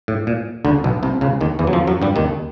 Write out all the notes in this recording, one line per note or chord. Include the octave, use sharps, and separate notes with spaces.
A2
A#2
D2 D3
B1 B2
C2 C3
C#2 C#3
D#2 D#3
E2 E3
F#3
F2 F3
F#2 F#3
G2 G3
D#2 D#3